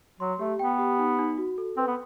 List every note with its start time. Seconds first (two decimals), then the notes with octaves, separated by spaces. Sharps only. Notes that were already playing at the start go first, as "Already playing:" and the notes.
0.20 F#3 C6
0.39 A3 G4
0.59 B3 G5
0.79 G4
0.99 D#4
1.19 D#4
1.38 F#4
1.58 A4
1.77 C4 B4
1.88 B3